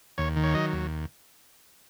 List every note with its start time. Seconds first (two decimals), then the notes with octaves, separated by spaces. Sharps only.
0.18 D#2 C#5
0.36 D#3
0.44 C#5
0.54 F#3 D#5
0.73 D#2